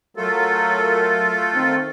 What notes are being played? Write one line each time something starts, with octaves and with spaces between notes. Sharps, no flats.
F#3 A3 F4 A4 A#4
D#3 C4